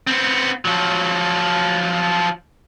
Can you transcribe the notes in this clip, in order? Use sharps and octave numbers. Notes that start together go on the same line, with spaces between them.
B3 C4
F3 F#3